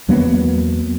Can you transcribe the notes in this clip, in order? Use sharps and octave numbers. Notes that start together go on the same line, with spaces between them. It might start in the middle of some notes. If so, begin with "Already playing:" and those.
E2 F#3 A#3 B3